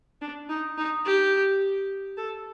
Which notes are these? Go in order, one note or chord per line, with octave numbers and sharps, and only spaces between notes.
D4
D#4
D#4
G4
A4